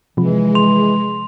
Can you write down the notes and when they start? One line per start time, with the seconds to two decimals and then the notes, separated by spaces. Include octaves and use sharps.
0.17 C3 E3 F3 G#3
0.55 C6 F7